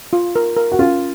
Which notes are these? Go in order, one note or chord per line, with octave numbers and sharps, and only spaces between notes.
F4
A#4
A#4
F#4
C#4 F4